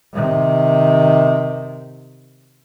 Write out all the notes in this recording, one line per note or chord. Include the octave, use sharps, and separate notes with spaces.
C3 D#3